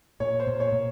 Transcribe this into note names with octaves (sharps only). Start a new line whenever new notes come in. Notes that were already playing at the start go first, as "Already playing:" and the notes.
A#2 C#5
C5
A#2
C#5
A#2